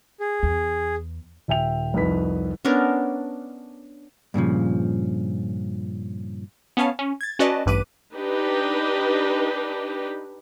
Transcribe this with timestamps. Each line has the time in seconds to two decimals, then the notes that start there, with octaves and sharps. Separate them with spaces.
0.20 G#4
0.43 E2
1.48 D#1 E5 G5 F7
1.94 C2 F2 D#4 B4 B6
2.65 B3 C#4 D4 A#4
4.34 G2 A#2 C#3 F3
6.77 B3 C#4 C#5 F5 A5
6.99 C#4
7.21 G#6 A6
7.39 C#4 F#4 B4 D5 D#5 A5
7.66 A1 G2 B4 D6 D#7
8.14 D4 D#4 G4 B4